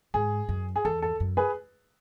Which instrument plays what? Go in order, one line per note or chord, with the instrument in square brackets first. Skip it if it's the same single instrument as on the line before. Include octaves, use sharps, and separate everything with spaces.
[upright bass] G#2 [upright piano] G#4
[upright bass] F#2
[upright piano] G#4
[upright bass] E2 [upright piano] A4
[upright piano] A4
[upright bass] F#2
[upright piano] G#4 B4